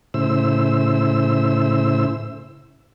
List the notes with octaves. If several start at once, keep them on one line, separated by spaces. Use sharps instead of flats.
A2 C#3 E4 C5 E6